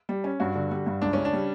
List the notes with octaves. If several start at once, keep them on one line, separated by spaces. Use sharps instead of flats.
G3
C#4
G2 F#4
D3
G3
G2
C#2 D4
C#3 C#4
D4
G3